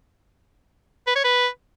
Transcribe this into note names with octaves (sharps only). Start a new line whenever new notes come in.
B4
C#5
B4